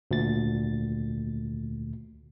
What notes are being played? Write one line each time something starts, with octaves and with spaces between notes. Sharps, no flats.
D2 A#2 A6